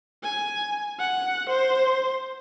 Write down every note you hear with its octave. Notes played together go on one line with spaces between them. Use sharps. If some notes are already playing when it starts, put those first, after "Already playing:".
G#5
F#5
C5